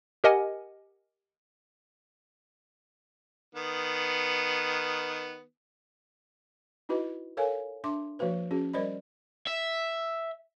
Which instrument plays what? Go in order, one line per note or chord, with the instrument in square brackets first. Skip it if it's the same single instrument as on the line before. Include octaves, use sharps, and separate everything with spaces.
[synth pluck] G4 A#4 D#5 F#5 G#5
[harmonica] D#3 B3
[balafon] D#4 E4 F#4 B4 D#5
A4 A#4 C#5 F5 G#5
D4 E5 C6 D6
F3 A#3 F#4 B4 C5
C#4 F#4 G#4
G3 A#4 C5 D5 D#5 B5
[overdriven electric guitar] E5